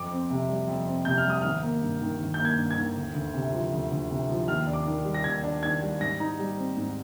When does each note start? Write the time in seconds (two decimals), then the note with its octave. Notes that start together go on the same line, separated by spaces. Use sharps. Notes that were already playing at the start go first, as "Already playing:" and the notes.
Already playing: F2 D6
0.11 C4
0.30 C3
0.48 G3
0.68 F2
0.87 C4
1.05 C3 G6
1.18 F6
1.25 G3
1.30 D#6
1.42 G#1 F6
1.63 A#3
1.82 G2
2.02 D#3
2.20 G#1
2.34 G6
2.39 A#3
2.45 G#6
2.57 G2
2.71 G#6
2.76 D#3
2.96 D2
3.15 D2
3.34 C3
3.53 F3
3.72 D2
3.91 D2
4.11 C3
4.29 F3
4.48 D#2 F6
4.67 D4
4.73 D6
4.86 D#3
5.05 G3
5.14 A#6
5.24 D#2 G#6
5.44 D4
5.63 D#3 G#6
5.82 G3
6.00 G#2 A#6
6.20 D#4
6.39 G3
6.57 C4
6.76 G#2